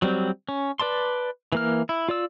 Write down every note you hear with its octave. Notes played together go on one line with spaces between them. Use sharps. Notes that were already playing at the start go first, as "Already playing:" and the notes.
F#3 G3 C4
C#4
B4 D5 A5 C6
E3 A#3 F6
E4
F4 D5 E6